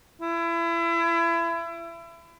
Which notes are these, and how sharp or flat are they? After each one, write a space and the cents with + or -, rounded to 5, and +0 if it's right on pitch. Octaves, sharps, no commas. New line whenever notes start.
E4 +30